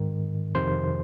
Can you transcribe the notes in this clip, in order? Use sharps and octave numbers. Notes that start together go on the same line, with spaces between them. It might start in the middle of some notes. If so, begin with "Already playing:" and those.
Already playing: G#2 D#3
F2 C3 D#3 C5 C6